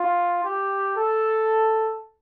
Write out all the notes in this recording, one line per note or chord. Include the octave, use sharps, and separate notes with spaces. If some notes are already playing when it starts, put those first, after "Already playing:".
Already playing: F4
G4
A4